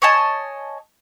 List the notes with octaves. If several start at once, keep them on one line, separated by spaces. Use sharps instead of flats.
C#5 D#5 G#5 A5